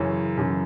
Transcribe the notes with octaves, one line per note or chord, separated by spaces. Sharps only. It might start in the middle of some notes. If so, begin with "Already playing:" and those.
Already playing: F#2 C#3 E3 C#5
F#2 C#3 E3